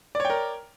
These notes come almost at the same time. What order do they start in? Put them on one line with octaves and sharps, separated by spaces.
D5 C#5 G5 A#4